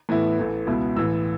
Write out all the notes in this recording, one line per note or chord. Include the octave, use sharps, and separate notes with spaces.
A2 E3 B3 E4
A1 A2 E3 A3
C#2 B2 B3 E4
A1 A2 E3 E6